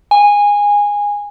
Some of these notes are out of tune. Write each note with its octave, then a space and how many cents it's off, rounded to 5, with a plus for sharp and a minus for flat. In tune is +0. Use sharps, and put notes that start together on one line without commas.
G#5 -15